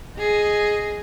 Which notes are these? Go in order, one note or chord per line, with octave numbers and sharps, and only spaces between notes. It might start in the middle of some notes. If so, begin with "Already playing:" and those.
G#4 D#5